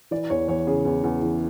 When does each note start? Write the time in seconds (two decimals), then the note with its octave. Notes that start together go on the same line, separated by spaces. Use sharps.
0.11 E3 D5
0.30 E2 C#5
0.48 E2 C#5
0.67 C#3 G#4
0.85 E2
1.03 E2
1.22 E3